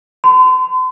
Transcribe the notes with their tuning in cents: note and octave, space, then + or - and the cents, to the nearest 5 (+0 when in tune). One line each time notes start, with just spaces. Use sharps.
C6 -40